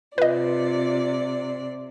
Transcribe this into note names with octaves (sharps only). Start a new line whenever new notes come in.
C3 F4 B4 D5 D#5